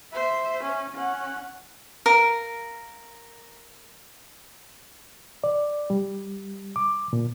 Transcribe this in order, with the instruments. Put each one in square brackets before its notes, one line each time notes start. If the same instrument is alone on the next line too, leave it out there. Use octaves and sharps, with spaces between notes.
[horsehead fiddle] C5 E5
C#4
C#4 F#5
[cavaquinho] A#4 F5
[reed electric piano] D5
G3
D6
A#2